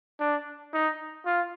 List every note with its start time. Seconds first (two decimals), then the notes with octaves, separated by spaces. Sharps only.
0.20 D4
0.74 D#4
1.26 F4